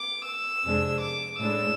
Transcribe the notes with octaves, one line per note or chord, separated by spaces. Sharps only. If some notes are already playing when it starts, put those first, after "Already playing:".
Already playing: D6
E6
F2 C3 G#3 D4
D6
A2 G#3 D4 E6